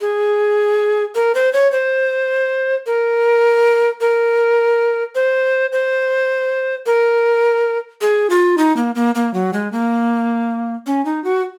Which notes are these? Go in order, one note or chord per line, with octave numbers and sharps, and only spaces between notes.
G#4
A#4
C5
C#5
C5
A#4
A#4
C5
C5
A#4
G#4
F4
D#4
A#3
A#3
A#3
F#3
G#3
A#3
C#4
D#4
F#4